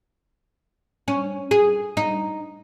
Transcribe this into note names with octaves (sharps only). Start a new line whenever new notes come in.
C#4
G#4
D#4